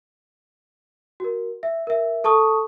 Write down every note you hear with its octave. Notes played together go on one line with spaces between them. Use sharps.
F#4 A#4
E5
A#4 E5
A4 A5 C#6 D#6